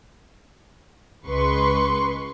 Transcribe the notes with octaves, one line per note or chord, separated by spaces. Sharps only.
C#2 G#3 B4 C6 C#6